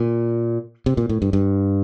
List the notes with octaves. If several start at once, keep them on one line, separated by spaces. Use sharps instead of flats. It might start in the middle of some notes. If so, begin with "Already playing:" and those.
Already playing: A#2
C3
A#2
A2
G2
G2